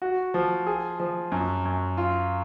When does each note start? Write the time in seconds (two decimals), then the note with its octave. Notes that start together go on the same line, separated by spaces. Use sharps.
0.02 F#4
0.34 F3
0.66 G#4
1.00 F3
1.32 F#2
1.65 F#2
1.97 F4